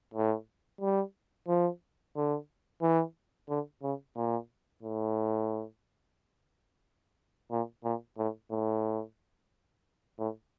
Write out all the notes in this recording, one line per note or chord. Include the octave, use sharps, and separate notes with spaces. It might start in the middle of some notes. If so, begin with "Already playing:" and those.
A2
G3
F3
D3
E3
D3
C#3
A#2
A2
A#2
A#2
A2
A2
A2